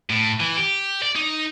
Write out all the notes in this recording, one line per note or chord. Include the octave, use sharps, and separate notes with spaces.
A2
E3
G4
D5
D#4